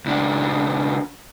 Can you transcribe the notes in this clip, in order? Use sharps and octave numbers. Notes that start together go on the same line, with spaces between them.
C#2 D4